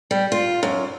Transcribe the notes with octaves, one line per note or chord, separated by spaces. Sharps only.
G3
F4
F#2